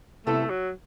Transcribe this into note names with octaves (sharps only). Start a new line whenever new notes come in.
C3 G3 A3 B3 E4 A4
F#3